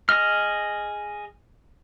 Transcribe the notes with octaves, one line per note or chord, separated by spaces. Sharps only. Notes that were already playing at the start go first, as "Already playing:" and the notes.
G#4 D#5 F6